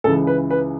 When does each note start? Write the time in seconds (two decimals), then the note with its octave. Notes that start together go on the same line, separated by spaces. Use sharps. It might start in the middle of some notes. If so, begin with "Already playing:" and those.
0.04 C#2 C#3 E3 A4
0.27 B4
0.51 B4